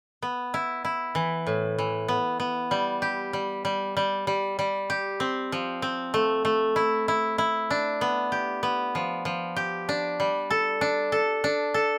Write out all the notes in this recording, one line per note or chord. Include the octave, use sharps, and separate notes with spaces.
B3
E4
E4
E3
A2
E3
B3
B3
G3
G4
G3
G3
G3
G3
G3
G4
C4
F3
C4
A3
A3
E4
E4
E4
D4
B3
G4
B3
F3
F3
G4
D4
G3
A4
D4
A4
D4
A4